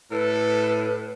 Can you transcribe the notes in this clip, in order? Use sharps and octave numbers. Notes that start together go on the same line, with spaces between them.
A2 A4 B4